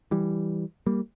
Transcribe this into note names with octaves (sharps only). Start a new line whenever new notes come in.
E3 G3
G3 A#3